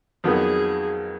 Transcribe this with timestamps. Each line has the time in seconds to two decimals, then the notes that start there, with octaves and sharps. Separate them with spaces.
0.24 F2 D#3 F#3 B3 G#4